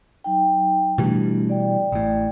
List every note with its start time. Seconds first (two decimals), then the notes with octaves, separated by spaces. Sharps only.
0.24 F#3 D#4 G5
0.98 B2 E3 G3 A3 D4
1.49 D5 G5
1.92 A1 A2